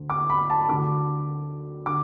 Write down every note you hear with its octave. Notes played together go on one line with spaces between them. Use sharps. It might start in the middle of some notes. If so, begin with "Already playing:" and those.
Already playing: D2 D3
D6
B5
A5
D2 D3 D6
D3 D6